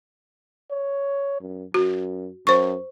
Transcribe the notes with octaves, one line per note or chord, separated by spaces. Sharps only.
C#5
F#2
F#2 F#4
F#2 C5 C#6